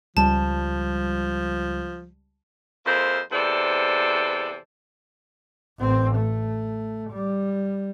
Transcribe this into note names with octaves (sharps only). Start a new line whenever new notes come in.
C#2 F3 G3 A5
F2 A#3 E4 G#4 C5
E2 C3 A4 C5 D5
A1 C4
A3
G3